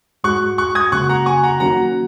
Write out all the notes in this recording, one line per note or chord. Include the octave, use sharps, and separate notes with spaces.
G#2 G#3 F#4 C#6 F#6
C#6 F#6
D#6 G#6
F#2 C#3 A#3 F#4 C#6 F#6
F#5 A#5
G#5 C#6
F#5 A#5
D#3 F#3 A#3 C#4 F#4 F#5 A#5